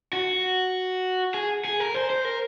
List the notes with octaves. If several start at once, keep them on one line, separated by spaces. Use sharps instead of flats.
F#4
G#4
G#4
A#4
C5
C5
A#4